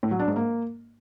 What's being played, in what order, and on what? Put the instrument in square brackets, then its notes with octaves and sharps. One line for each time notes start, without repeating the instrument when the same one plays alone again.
[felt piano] A2
F#3
D4
G#2
A#3